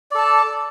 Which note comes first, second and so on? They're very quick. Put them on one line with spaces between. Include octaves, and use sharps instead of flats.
D5 A4 A5